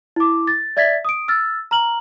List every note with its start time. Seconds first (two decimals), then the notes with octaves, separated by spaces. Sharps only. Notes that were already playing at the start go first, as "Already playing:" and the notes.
0.16 E4 D6
0.47 A6
0.77 D5 E5 G#6 A6 B6
1.05 D#6 D7
1.28 E6 F6 A6
1.71 A#5 F6 F#7